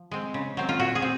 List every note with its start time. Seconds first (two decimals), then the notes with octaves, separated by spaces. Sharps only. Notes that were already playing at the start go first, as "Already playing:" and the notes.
Already playing: F3
0.11 G#3 C4
0.34 C#3
0.57 F#3 C4
0.69 F4
0.79 A#2 F#4
0.95 G#4
1.02 C4